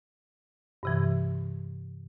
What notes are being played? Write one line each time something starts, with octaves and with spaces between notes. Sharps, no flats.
G2 C3 E3